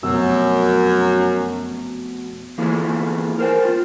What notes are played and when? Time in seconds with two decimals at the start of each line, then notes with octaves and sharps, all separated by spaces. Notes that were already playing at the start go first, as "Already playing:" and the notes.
0.03 F1 F#2 B2 E6
2.58 E3 A#3 E4 F4 G#4 A4
3.39 A#4 C5 G5
3.65 F4